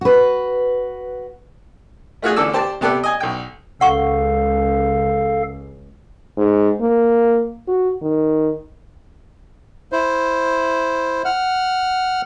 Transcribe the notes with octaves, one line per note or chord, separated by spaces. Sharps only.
F#4 B4
A3 F4 F#4 G#4
A1 D3 A4 D5 E6
G4 C5 D5 A5
C3 B3 G4 A4 D5 F#6
D#5 G#5
B1 G5
C#2 A4 F5 F#5 C#6
G#2
A#3
F#4
D#3
E4 C5
F#5 F6